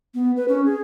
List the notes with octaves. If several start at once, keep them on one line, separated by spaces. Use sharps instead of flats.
B3
B4
C#4
G#4